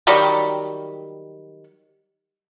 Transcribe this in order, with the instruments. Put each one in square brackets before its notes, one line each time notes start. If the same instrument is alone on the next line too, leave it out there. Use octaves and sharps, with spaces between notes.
[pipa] D#3 F#3 G3